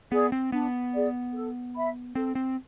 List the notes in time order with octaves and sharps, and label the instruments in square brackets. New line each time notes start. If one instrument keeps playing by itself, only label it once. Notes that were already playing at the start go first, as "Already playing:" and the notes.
[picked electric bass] B3 [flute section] G#4 D5
[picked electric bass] C4
[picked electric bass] B3 [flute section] D4
[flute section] G#4 D5
A4
E5 B5
[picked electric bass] C4 [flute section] A4
[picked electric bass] C4